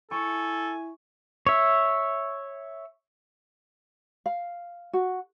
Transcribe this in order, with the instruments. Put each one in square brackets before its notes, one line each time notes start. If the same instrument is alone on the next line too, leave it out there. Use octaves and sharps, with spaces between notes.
[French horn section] E4 [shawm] A4 [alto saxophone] G#5 [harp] C#6
[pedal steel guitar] C#5 E5
[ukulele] F5
F#4